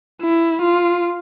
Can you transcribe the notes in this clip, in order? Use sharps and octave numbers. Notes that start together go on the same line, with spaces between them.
E4
F4